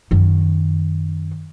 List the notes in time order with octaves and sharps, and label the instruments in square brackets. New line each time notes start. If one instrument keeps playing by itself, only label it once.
[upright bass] F#2 D#3